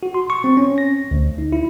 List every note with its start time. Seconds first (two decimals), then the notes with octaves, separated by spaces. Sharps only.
0.03 F#4
0.14 C6
0.30 C#6
0.44 C4
0.57 C#4
0.78 A#6
1.11 D2
1.38 D#4
1.52 E4